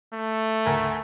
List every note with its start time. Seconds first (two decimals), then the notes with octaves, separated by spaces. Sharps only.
0.14 A3
0.65 D2 A#4 G#5